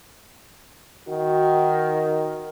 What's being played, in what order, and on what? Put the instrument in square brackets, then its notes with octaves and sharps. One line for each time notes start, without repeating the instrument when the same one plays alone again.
[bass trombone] D#3 [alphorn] F#4